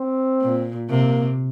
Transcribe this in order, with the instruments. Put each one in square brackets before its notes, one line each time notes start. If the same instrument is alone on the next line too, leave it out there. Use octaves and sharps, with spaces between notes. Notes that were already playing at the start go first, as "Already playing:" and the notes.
Already playing: [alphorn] C4
[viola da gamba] A#2
[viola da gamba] C3 [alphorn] A#3